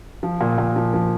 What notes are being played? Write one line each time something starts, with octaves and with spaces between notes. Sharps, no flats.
F3
A#2
A#2
F3
F3